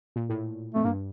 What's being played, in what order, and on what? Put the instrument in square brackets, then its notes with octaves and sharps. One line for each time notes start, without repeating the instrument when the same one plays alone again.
[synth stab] A#2
A2
[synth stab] F2 [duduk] A3
[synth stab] G2 [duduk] A#3